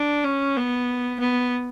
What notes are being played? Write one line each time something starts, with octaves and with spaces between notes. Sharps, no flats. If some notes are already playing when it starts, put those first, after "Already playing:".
Already playing: D4
C#4
B3
B3